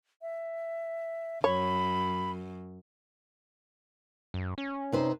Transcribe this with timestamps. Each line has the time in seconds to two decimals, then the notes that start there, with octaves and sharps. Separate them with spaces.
0.22 E5
1.44 F#2 C#5 B5
4.34 F#2
4.58 C#4
4.92 C3 D#4 B4 C5